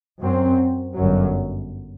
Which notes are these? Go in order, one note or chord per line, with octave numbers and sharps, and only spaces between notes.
F#2 F#3 C4
G1 F#2 F#3